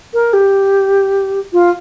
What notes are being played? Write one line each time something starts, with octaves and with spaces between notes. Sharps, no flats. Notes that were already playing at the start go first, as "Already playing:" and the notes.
A#4
G4
F4